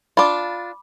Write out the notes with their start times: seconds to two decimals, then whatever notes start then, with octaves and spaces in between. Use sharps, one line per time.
0.17 D4 F4 B5 D6